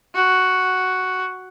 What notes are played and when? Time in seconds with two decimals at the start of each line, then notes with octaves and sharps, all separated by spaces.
0.15 F#4